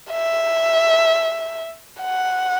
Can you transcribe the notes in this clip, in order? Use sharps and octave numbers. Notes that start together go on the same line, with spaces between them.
E5
F#5